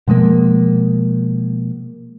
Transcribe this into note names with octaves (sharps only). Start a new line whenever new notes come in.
B2 F3 G#3 A#3